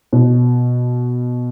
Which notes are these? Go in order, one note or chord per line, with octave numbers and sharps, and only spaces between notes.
B2